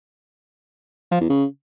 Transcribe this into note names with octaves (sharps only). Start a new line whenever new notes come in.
F3
E2
C#3